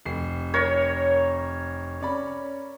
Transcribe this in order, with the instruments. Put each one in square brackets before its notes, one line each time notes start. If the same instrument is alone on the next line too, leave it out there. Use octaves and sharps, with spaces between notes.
[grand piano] F1 C7
[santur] A#4 C#5
[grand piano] C#4 D5 B5